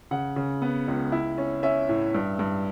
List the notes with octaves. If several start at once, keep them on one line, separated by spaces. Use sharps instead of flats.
C#3 F#5
C#3
B3
C#2
E4
C#4
C#4 E5
A2
G2
G2